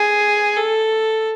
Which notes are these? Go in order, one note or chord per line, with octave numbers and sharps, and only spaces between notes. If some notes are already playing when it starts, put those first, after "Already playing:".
Already playing: G#4
A4